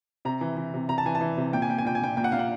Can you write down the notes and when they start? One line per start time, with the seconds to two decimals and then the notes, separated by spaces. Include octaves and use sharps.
0.25 C3 A#5
0.41 E3
0.57 E3
0.74 C3
0.89 C3 A#5
0.98 A5
1.05 E3 G#5
1.15 A5
1.21 E3
1.37 C3
1.53 A#2 G5
1.62 G#5
1.69 A#2 G5
1.78 G#5
1.85 A#2 G5
1.95 G#5
2.01 A#2 G5
2.17 A#2 G5
2.24 F#5
2.32 A#2 F5
2.39 F#5